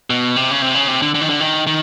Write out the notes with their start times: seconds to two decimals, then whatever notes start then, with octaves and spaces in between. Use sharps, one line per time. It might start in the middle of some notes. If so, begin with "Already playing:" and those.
0.10 B2
0.36 C3
0.51 C#3
0.62 C3
0.75 C#3
0.88 C3
1.02 D3
1.15 D3
1.21 D#3
1.29 D3
1.40 D#3
1.67 D#3